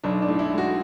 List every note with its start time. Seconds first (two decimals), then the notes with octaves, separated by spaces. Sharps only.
0.03 B1 D4
0.22 D4
0.28 A2
0.39 E4
0.52 G#3
0.58 F#4